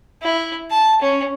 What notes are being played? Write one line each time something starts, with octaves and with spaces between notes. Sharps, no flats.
E4
A5
C#4